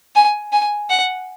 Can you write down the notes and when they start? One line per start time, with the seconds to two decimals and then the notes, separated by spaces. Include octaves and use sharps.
0.15 G#5
0.53 G#5
0.90 F#5